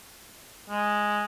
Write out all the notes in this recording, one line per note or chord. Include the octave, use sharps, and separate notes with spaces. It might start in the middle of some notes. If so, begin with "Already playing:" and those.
G#3